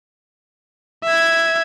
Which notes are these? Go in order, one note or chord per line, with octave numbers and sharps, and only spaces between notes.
E5 G#6